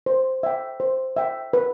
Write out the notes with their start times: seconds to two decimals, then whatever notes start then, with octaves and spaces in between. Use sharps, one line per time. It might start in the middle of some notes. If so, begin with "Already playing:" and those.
0.06 C5
0.43 E5 G5
0.80 C5
1.16 E5 G5
1.53 B4